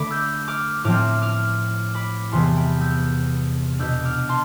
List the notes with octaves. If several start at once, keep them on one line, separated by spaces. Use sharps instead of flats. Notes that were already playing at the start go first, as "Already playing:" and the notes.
Already playing: D3 A3 D5 B5 D6
E6 G6
D6 F6
A2 F3 C4 D6 F6
D6 F6
B5 D6
E2 C3 E3 B3 A5 C6
G5 B5
E6 G6
B2 B3 D4 E6 G6
D6 F6
A5 C6